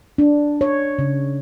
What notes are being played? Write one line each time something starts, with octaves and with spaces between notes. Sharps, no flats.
D4
C#5
C#3